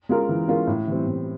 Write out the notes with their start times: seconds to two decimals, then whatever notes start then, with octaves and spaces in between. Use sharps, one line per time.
0.09 G#3 C#4 F4 A#4
0.29 E3
0.48 G#3 C#4 F4 A#4
0.67 A2
0.87 E3 G3 C4
1.07 A2